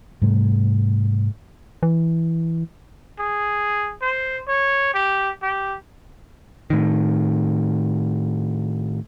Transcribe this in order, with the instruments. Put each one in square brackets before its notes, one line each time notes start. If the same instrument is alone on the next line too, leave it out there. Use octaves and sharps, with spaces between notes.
[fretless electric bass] G#2 C3 G3 A3
[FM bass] E3
[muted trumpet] G#4
C5
C#5
G4
G4
[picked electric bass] A2 D#3